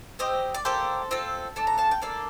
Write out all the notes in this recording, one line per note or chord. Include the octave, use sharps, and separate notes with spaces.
C4 G4 C5 D#5
D5
A#3 D4 G4 A4 C5
C4 F4 A4
D4 A4 A5
A#5
F5 A5
G5
A#3 D4 A4 D5 F5